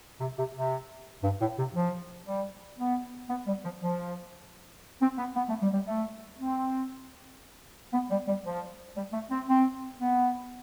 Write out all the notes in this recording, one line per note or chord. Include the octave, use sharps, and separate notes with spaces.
C3
C3
C3
G2
A2
C3
F3
G3
B3
B3
G3
F3
F3
C4
B3
B3
A3
G3
G3
A3
C4
B3
G3
G3
F3
G3
A3
C4
C4
B3